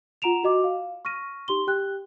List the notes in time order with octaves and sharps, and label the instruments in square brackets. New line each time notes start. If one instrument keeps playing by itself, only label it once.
[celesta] F4 F#5 A#5 D7 E7 F7
F#4 D#5 D6
F5
C#6 F6 A#6 D#7
D#4 G4 C6 G7
G4 G5 F#6